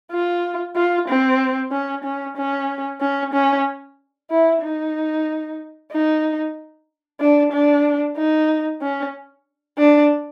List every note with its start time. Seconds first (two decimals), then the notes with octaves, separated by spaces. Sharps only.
0.11 F4
0.76 F4
1.08 C4
1.71 C#4
2.04 C#4
2.37 C#4
3.01 C#4
3.34 C#4
4.30 E4
4.62 D#4
5.92 D#4
7.20 D4
7.52 D4
8.16 D#4
8.81 C#4
9.78 D4